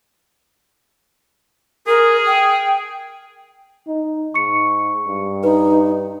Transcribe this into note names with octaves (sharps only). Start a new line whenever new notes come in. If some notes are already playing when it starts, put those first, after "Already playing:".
G#4 A#4
G5
D#4
G#2 C#6 C#7
G2
D#4 B4